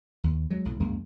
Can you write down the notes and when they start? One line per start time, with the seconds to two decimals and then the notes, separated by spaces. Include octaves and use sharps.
0.24 D#2
0.50 F#3 G#3
0.65 B1 A2
0.80 C#2 F#2 G#3 A#3